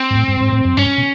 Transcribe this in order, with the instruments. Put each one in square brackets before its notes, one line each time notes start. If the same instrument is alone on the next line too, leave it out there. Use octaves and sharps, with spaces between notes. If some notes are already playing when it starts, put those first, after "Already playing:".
Already playing: [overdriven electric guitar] C4
[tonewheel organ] G#2
A2
G2
G#2
A2
F#2
[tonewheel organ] G2 [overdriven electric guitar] C#4
[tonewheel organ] B2